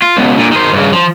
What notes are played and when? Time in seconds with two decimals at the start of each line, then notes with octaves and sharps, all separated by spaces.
0.02 F4
0.17 C#2 B2
0.37 A#2 D3
0.52 D#3 C5
0.73 G2 C#3
0.93 F3